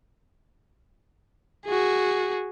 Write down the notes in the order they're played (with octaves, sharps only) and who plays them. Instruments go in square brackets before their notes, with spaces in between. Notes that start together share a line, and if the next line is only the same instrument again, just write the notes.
[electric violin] F#4 G#4